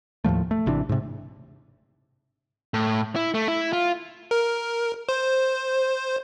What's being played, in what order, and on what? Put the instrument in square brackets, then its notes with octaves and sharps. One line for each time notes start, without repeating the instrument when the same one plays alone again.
[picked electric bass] D#2 A2 F3 A3
A3
G#1 C3 E3 D4
G#2 C3
[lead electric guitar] A2
E4
A3
E4
F4
[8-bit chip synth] A#4
C5